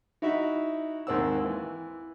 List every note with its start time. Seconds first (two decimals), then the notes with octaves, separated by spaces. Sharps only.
0.22 D#4 E4 F#4 E5
1.07 D#2 G#2 C4 F#5 E6
1.44 E3